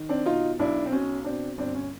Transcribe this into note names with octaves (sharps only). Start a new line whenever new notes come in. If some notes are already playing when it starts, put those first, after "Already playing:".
Already playing: D#3
C4 D4
B2 D#4 F4
B1 D4 E4
C4
B2 C#4
B2 C4 D4
G1 C4 D4
C#4